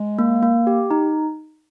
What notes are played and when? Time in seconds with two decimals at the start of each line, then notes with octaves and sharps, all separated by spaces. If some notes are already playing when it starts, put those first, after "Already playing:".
Already playing: G#3
0.19 A#3
0.43 A#3
0.67 G4
0.91 D#4